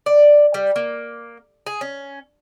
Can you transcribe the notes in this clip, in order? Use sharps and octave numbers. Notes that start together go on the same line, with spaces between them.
D5
G3
A#3
G#4
C#4